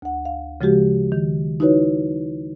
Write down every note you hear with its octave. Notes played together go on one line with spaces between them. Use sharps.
D2 F#5
F5
C#3 F3 G#3 F#4 G4
D#3
D#4 E4 F#4 B4 C#5